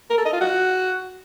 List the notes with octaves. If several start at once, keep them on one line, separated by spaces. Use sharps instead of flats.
A#4
A4
D#5
F4
F#4